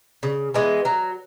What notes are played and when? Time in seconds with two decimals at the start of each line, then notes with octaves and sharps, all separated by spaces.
0.23 C#3
0.54 E3 G#3 B3
0.85 F#3